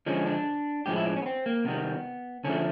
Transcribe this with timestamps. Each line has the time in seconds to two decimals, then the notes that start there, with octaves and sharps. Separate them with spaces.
0.06 D3 F3 G#3 C#4
0.26 D4
0.86 A2 F3 G#3 G4
0.96 E4
1.05 D4
1.16 C#4
1.22 B3
1.26 C4
1.46 A#3
1.65 C3 D#3 G3 B3
2.44 D3 F3 A3 C#4